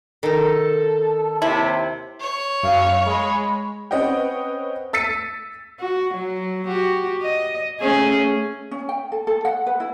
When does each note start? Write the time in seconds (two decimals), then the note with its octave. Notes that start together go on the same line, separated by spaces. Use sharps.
0.23 D#3 D#4 A4
1.42 D#2 C3 E4
2.21 C#5
2.63 F#2 F5
3.06 G#3 B5
3.91 C4 C#4 B4 D#5 F#5 G5
4.93 E6 A6 B6 C#7 D#7
5.80 F#4
6.14 F#3
6.67 F#4 G4
7.22 D#5
7.81 A3 C#4 G#4
8.71 C#4
8.89 G5
9.12 A4
9.27 A4
9.45 F#5
9.67 B4
9.80 E4